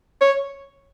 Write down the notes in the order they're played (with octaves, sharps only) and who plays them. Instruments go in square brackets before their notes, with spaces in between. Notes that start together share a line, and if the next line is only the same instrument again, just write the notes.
[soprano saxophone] C#5